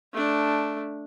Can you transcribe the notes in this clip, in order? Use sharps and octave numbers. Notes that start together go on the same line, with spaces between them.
A3 D4